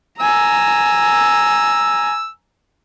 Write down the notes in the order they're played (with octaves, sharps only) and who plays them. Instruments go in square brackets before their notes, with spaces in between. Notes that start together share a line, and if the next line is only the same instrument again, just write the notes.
[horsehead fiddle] G#5 A#5 [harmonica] E6